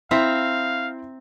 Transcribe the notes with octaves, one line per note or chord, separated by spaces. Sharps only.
C4 E4 E5 F5 A#5 C6